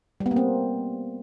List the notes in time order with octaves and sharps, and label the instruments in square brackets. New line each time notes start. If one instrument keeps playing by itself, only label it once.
[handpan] G3
B3
A#3
C4